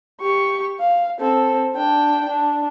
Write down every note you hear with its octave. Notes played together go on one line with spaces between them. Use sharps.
G4 C#6
F5
C4 A4
D4 G5
D4